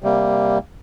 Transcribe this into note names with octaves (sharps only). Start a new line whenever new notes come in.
C3 G3 A#3